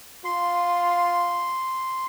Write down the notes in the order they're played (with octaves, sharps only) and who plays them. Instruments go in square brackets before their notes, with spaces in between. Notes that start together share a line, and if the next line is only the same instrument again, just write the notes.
[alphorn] F4 [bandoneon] C6